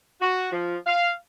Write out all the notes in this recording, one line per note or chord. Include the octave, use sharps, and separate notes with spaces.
F#4
F3
F5